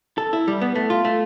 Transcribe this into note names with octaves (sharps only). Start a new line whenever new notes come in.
A4
E4
G3
B3
A3
F4
A3